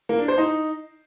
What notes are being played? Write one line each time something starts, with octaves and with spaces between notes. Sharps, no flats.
A#3
D4
C5
D#4